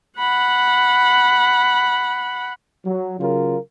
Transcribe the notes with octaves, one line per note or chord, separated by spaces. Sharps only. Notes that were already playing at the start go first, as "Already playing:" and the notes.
F#5 B5
F#3
C#3 F#3 F4 A#4